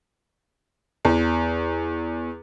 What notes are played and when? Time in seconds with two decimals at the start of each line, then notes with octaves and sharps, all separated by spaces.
1.05 E2